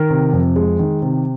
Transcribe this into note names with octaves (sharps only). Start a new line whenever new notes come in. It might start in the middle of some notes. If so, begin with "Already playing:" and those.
Already playing: D#3 A#4
C3
F2
G#3
D#3
C3